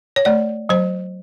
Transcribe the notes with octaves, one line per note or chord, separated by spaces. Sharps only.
C#5
A3 D5
F#3 C5